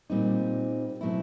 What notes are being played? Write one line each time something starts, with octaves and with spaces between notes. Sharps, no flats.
A#2 G3 C4 D#4
B2 F#3 A3 C4 E4